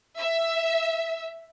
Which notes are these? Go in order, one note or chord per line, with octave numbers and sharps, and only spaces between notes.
E5